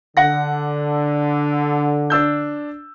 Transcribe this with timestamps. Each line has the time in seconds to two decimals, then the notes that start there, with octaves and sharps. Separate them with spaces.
0.17 D3 F#5 A#6
2.10 D4 E6 G6